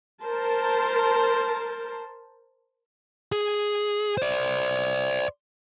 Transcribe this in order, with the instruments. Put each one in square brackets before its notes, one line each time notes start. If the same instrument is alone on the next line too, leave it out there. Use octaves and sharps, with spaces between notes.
[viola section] A#4 C5 A5
[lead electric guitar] G#4
C5 D5